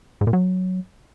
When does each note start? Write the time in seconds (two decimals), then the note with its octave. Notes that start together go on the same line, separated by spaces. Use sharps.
0.21 G#2
0.27 A#2
0.33 F#3